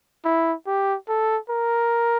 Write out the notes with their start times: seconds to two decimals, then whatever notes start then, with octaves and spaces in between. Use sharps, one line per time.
0.24 E4
0.66 G4
1.08 A4
1.49 A#4